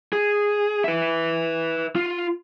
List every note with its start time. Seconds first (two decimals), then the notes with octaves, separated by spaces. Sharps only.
0.13 G#4
0.84 B4 E5
1.95 F4